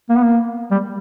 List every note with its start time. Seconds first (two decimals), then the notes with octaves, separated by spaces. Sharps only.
0.10 A#3
0.17 B3
0.24 A#3
0.71 G3